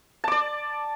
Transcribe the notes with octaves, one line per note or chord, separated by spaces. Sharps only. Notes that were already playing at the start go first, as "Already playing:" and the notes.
D5 A5 D6